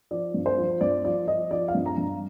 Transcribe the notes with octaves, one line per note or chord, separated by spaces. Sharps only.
F3 D5
G2
C5
F3
G2 D5
F3 D5
F3 D#5
F3 D5
F5
G2
A#5
G2